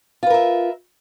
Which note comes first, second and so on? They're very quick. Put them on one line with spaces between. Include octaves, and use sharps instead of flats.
F4 B4 A#4 E5